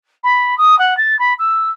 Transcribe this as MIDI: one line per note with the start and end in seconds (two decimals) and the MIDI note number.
0.23 0.57 83
0.58 0.78 87
0.79 0.97 78
0.97 1.18 93
1.19 1.34 83
1.39 1.70 88